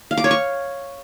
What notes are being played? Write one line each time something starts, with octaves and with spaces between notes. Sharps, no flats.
F5
D6
C#5
C#6